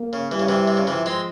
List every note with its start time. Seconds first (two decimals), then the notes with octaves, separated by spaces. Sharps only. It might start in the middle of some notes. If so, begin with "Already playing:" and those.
Already playing: A#3
0.13 C#3
0.31 E3 G3
0.39 C#3
0.49 C3 E3
0.68 C3
0.77 C#3
0.87 C3 E3 F3
1.06 G#3 C4